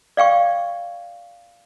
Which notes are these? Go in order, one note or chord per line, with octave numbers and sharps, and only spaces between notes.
D5 F5 G5 C#6